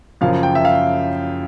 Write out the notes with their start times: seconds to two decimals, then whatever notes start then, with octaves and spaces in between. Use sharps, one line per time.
0.21 F#1 F#2 C#3 F3 F5
0.43 G5
0.55 E5
0.65 F5